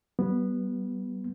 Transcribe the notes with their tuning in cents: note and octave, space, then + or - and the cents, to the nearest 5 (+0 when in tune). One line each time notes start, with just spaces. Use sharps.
G3 -30 B3 -10